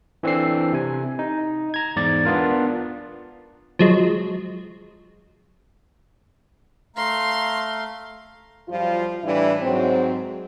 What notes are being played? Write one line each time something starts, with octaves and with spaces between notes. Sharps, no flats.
E3 C4 D4 A4 C7
C3 G#5
D#4
A#5 G#6
E2 G#2 D5 A6
B3 D4 F4 A#4
F3 F#3 G#3
A3 F5 A#5 C6
F#2 F3 G3 F4
A2 E3 G3 D4 E4
G#2 F#3 C4